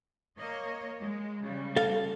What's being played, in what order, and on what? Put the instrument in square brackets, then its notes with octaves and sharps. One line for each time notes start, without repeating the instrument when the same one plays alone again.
[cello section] A#3 C#5 D#5
G#3
C#3 G3
[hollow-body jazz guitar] A4 F5